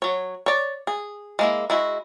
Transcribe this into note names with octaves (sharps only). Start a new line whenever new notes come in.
F#3 C#5
C#5 D5
G#4
G#3 A#3 E4
G#3 E4 F#4